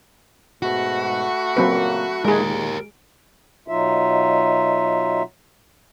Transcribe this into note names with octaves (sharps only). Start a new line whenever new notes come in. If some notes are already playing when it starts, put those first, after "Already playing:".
G#2 B2 A3 F#4 F#5 B5
A#2 C#3 F#3 A#3 C4 B4
A#2 D#3 G#3 G4 G#4 A#4
B2 F#3 D#4 F4 E5